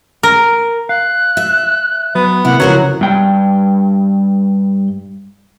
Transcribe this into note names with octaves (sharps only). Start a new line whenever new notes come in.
A#4
F5 F#6
E5
F#3 B3
C3 A#3 E4 F#5
C#3 F3 F#3 B3 A#4 C5
G2 G5